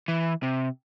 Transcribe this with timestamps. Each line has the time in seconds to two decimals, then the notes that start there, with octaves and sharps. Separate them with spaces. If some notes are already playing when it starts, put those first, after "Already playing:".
0.08 E3
0.43 C3